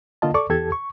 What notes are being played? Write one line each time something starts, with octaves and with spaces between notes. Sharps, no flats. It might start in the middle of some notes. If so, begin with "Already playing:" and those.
D3 A#3 F4 D#5 A5
A4 D5 C#6 D6
E2 G4 A4 A5 G#6
C#6